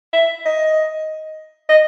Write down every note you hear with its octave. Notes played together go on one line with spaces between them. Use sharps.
E5
D#5
D#5